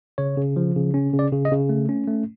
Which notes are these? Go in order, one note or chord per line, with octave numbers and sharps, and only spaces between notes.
C#3 C#5
C#3
F3
C#3
C#4
C#3
D5
C#3
D#5
C#3
A3
C#4
A3